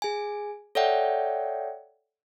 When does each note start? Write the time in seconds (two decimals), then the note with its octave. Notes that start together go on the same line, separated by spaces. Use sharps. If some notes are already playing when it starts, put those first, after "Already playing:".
0.02 G#4 G#5
0.75 A4 C#5 D5 E5 F#5 G5